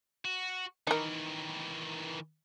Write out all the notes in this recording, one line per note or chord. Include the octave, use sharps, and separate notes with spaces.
F#4
D#3 E3 D#4 A#4